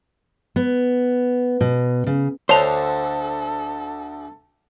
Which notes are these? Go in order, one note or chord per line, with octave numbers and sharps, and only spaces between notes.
B3
B2
C#3
D2 D3 A4 C5 C#5 A5 F7